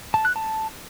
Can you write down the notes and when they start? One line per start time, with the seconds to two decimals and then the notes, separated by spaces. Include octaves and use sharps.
0.14 A5
0.25 F#6
0.36 A5